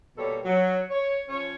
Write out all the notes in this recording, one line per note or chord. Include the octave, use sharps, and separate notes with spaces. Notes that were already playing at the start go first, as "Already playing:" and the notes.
B2 G3 A#3 A4 C#5
F#3
C#5
F3 C#4 C#5